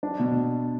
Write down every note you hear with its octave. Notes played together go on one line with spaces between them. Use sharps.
D4
B2